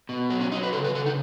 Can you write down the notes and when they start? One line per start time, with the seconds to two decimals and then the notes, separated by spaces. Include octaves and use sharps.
0.09 B2
0.30 F#3 B3
0.41 C#4
0.52 F#3 D#4
0.63 B4
0.73 C#3 A4
0.84 B4
0.95 C#3 A4
1.06 D#4